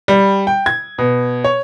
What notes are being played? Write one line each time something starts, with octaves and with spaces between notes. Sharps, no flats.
G3
G5
G#6
B2
C#5